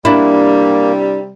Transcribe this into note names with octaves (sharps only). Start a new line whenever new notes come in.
C3 G3 A#3 D4 E4